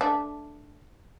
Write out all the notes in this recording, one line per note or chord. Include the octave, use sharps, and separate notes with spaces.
A3 D4